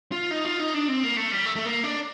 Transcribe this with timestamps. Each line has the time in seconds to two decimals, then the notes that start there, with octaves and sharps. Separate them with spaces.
0.12 F4
0.31 D#4
0.45 F4
0.59 D#4
0.74 D4
0.88 C4
1.03 A#3
1.16 A3
1.32 G3
1.45 A3
1.56 A3
1.66 A#3
1.84 D4